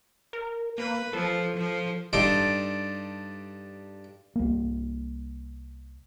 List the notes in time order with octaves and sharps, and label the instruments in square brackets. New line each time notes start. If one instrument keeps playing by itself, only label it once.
[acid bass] A#4
[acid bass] A#3 [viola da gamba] B4
[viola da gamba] F3 [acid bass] A4
[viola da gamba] F3
[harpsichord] G2 D#4 A4 D5 C6
[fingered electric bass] C2 A#3